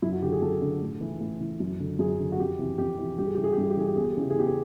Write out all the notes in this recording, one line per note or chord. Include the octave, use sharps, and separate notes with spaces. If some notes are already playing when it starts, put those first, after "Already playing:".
F#2 E4
F#4
D3 G4
G#4
F#2 A4
D3
A2
E3
A2
E3
F#2
D3
F#2 G#4
D3
F#4
F2 G4
C3 E3
F2 G4
C3 E3
G2 G4
G#4
E3 G4
G#4
G4
G2 G#4
G4
E3 G#4
G4
E2 G#4
G4
G#4
C#3 E3 G4
G#4
E2 G4
G#4